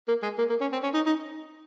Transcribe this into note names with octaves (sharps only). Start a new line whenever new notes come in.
A#3
G#3
A#3
A#3
C#4
C4
C#4
D#4
D#4